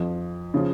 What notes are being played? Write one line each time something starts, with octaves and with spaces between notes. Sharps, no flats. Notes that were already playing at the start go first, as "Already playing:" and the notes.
Already playing: F2 F3
C#3 F3